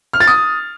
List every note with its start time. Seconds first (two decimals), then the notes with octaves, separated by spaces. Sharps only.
0.13 F6
0.20 A6
0.27 D#6